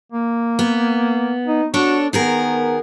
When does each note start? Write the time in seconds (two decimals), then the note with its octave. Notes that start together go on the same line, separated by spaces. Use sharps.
0.12 A#3
0.59 B3
1.47 D#4
1.74 D4 F#4 A4 C#5
2.13 D#3 B3 G#4 A#4